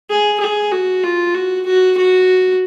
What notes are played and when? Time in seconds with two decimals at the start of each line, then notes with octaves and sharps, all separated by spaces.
0.09 G#4
0.40 G#4
0.72 F#4
1.03 F4
1.34 F#4
1.66 F#4
1.98 F#4